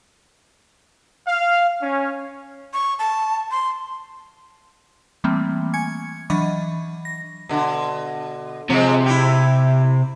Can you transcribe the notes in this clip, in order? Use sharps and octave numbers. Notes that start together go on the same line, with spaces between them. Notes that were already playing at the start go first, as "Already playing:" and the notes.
F5
C#4
C#6
A5
C6
E3 G3 A3 A#3 C4
G#5 C#6 G#6 C#7
E3 F#3 D4 D#5 B5 C#6
A#6
B2 D3
C3 F3 G#3
E4 G4